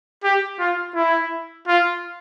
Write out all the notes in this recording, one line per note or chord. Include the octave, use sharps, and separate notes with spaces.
G4
F4
E4
F4